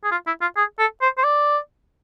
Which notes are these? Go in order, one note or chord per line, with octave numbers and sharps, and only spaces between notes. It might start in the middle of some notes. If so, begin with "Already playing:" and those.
G#4
F4
E4
F4
G#4
A4
C5
C5
D5